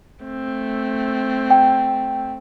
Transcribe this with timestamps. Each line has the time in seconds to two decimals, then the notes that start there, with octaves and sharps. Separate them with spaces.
0.24 A3 C4
1.50 G5